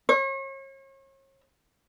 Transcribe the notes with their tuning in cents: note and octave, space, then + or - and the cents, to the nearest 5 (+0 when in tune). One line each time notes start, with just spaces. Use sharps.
C#5 -40